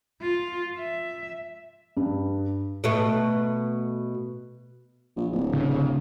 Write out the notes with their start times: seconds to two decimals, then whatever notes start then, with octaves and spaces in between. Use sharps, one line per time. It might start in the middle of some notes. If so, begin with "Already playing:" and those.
0.22 F4
0.79 E5
1.97 G2
2.84 B2 A3
5.16 A#1
5.32 D1
5.53 C#3